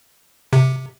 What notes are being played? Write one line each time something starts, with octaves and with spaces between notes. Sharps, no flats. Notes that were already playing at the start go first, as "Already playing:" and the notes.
C3